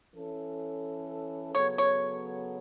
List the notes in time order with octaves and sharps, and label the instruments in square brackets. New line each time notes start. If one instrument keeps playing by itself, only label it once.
[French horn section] E3 C#4 A4
[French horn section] C#3 F#3 B3 A4 [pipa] C#5
[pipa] C#5